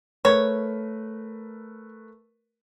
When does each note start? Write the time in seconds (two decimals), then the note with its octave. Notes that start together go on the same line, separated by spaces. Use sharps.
0.25 A3 A#4 B4 C#5